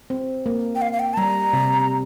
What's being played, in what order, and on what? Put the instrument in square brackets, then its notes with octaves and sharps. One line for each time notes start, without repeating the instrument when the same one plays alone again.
[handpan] C4
A#3
[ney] G5
F5
F5
G5
A5
[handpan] G3 [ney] A#5
[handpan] C3